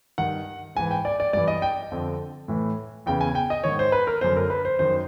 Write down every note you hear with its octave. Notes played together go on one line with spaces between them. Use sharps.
G2 D#3 F#5
G#2 E3 G#5
G5
D5
D5
G2 E3 D5
D#5
G5
F2 D3
A2 E3
E2 C#3 E3 G5
G#5
G5
D#5
G#2 D#3 C#5
C5
B4
A#4
F#2 D3 C5
A#4
B4
C5
F#2 D#3 C5